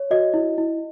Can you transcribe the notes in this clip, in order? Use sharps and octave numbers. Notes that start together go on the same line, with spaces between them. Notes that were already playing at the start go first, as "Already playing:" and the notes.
Already playing: C#5
F#4 D#5
E4
E4